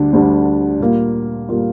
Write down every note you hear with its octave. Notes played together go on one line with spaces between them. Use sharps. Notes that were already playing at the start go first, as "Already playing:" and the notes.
Already playing: D2 D3 G3 D4
D2 D3 G3 D4
A#2 G3 A#3 F4
A#2 G3 A#3 F4